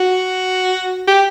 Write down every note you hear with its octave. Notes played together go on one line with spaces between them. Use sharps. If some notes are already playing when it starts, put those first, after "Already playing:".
Already playing: F#4
G4